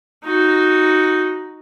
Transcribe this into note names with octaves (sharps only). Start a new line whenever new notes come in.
D#4 F#4